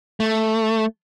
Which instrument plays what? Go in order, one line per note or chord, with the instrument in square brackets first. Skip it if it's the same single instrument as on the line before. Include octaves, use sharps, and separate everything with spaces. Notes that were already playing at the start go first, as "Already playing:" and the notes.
[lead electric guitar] A3